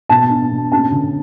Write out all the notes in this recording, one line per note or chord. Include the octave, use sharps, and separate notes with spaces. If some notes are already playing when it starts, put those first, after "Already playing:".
B2 A5
D4
B2
C#4 A5
D3